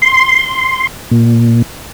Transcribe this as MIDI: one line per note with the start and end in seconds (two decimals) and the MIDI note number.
0.02 0.87 84
1.11 1.62 46